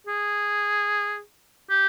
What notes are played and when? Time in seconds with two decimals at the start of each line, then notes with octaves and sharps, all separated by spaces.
0.07 G#4
1.70 G4